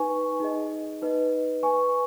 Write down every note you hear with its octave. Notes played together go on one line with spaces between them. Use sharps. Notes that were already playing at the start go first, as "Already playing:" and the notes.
Already playing: D#4 B4 G#5 C#6
D#4 G#4 D#5
D#4 B4 D#5
B4 G#5 C#6